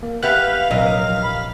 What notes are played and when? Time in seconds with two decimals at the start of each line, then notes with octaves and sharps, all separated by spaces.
0.03 A#3
0.23 B3 G4 B4 E5 F5 F#6
0.71 A#1 C3 F#3 A#4 D#5
1.23 B5